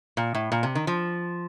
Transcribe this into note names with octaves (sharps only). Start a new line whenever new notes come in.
A#2
A2
A#2
C3
D#3
F3